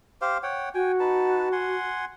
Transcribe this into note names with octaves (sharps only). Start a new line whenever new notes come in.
G4 C5 F5
C#5 F#5 G5
F#4 G5 G#5
D#4 B4 A5
F#5 G#5 C6